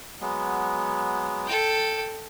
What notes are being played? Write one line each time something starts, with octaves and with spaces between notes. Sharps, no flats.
F#3 G#3 B3
A4 G5